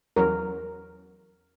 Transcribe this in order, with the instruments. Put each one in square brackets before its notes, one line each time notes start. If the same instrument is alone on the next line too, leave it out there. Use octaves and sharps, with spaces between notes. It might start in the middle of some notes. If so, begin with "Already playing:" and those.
[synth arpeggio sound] E2 F#3 C#4 [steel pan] A#4